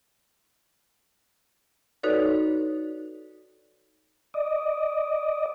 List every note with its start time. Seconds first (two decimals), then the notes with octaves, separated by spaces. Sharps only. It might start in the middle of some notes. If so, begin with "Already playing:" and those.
2.03 D#4 F#4 A4 B4 C#5 D5
4.34 D5 D#5